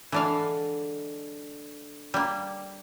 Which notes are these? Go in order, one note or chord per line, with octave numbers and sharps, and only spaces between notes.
D3 E3 G#3 D4 F5
G3 A#3